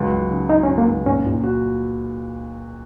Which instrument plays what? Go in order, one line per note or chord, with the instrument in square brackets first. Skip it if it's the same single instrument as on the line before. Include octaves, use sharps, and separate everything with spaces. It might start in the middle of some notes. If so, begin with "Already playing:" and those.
Already playing: [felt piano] C#2 F#3
F#3
C#3
[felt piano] F#3 [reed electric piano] D#4
[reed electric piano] C#4
[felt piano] C#3
[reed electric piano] A#3
[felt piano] C#2
[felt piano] A#2 [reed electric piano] C#4
[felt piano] A#2
F#4